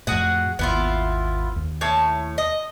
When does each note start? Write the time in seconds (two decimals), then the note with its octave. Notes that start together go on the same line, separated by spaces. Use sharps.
0.07 F2 A2 F#4 G#4 F#5
0.59 G#1 D#2 B3 E4 F4
1.56 D#2
1.81 A2 C#5 A5
2.38 D#5